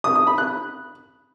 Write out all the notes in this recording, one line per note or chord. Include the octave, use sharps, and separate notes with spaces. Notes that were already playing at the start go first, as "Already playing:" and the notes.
D#6
D#6
B5
F#6